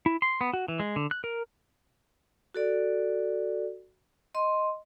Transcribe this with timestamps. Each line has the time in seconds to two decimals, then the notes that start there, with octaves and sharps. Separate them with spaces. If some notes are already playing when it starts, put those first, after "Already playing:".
0.06 E4
0.22 C6
0.41 B3
0.54 F#4
0.68 E3
0.80 G#3
0.96 D3
1.11 F#6
1.24 A#4
2.54 F#4 A4 D5
4.35 D#5 C6